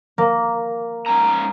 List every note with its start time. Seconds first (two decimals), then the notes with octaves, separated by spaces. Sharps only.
0.18 A#3
1.06 G#2 C#4 A#5